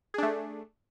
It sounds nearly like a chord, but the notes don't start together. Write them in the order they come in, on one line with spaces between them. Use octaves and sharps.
G#4 D4 A3